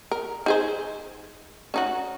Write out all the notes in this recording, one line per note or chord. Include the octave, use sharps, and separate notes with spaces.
A#4
D#4 G#4 C5
C#4 D#4 F#4